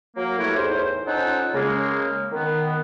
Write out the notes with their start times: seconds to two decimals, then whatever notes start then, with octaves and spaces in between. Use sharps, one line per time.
0.17 F#3 A#3
0.38 A3 E4 G4 A#4 B4 C#5
0.56 E2 A2 D#4 C5
1.08 C#4 D#4 F4 A4 C5 F#5
1.54 C#3 G#3 A#3
2.32 D#3 B3